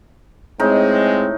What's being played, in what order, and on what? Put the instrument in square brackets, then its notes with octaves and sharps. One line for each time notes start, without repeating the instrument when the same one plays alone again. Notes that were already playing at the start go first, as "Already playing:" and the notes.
[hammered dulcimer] A2 D#4 [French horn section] G#3 C4